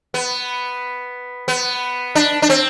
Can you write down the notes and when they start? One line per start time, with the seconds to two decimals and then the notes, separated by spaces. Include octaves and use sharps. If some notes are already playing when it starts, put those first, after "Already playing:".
0.14 B3
1.48 B3
2.15 D4
2.42 D4
2.50 C4